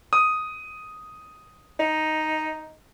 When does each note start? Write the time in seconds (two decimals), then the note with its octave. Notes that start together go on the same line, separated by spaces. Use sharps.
0.13 D#6
1.79 D#4